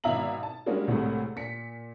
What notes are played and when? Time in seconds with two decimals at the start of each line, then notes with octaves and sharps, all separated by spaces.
0.04 G#1 B2 E5 F5 A#5 F#7
0.43 A5
0.66 G3 G#3 A#3 C#4 D4 F#4
0.88 C2 A2 C3 G#3 A3
1.36 A#2 B6 C#7